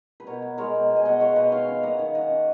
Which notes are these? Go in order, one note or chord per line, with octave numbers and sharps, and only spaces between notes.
B4
B2 A#4 C#5
B3
G#3 A#4 C#5
B2
B2
G#5
B3 D#5 F#5
G#3 C#5 F5
B2 B4 D#5
D#3 C#5 F5
C#4
A#3 D#5 F#5
D#3
D#3 D#5 F#5
C#4